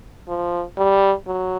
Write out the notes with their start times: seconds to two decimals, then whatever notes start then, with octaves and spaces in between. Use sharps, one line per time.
0.28 F3
0.78 G3
1.27 F#3